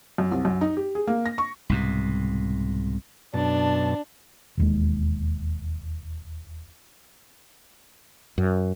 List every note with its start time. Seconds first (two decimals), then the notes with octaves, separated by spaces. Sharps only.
0.18 F#2
0.32 C2
0.45 F#2
0.61 D#4
0.77 G4
0.95 G#4
1.07 A#3
1.26 A#6
1.38 C#6
1.69 C2 G#2 B2
3.34 F#2 B2 D4 A5
4.57 E1 D#2 G#3
8.38 F#2